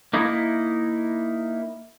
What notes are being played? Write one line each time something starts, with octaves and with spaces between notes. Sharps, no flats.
A#3 D#4 E4